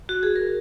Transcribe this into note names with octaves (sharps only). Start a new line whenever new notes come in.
F#4
G#4
A#4